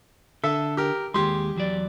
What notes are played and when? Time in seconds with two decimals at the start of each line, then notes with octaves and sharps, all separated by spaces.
0.43 D3 A4 E5 A5
0.77 G4 A#4
1.14 D#2 G#3 G4 C6
1.56 E2 F#3 D5